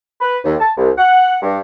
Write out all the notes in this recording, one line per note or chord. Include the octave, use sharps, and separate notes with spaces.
B4
D#2
A5
C2
F#5
G2